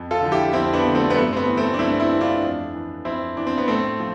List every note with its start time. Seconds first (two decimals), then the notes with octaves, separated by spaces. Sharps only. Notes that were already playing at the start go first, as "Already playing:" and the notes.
Already playing: F2
0.11 F4 A4
0.21 D3 F3
0.31 E4 G4
0.53 F2 C4 E4
0.73 B3 D4
0.84 D3 F3
0.95 A3 C4
1.10 B3
1.16 G2 A3
1.33 C4
1.37 B3
1.47 E3
1.57 A3 C4
1.74 D4
1.79 G2 C4 E4
2.00 C4 E4
2.10 E3
2.21 D4 F4
2.42 F2
2.73 E3
3.05 F2 C4 E4
3.36 E3 D4
3.47 C4
3.58 B3
3.68 A2 A3 C4
3.99 F3